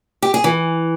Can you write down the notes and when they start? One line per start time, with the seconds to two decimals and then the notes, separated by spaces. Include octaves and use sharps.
0.22 G4
0.34 G#4
0.44 E3